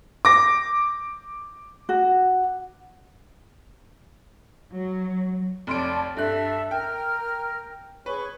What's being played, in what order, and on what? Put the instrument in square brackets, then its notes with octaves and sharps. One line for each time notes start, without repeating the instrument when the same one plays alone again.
[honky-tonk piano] D6 A#6
[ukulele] F#4
[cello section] F#3
[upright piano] F1 C6 D7 [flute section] C#5 D5 A5
[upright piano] G2 F#6 [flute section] A4 E5
[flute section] A#4 F6 [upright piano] G5
[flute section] G#4 C#5 C#6 [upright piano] B4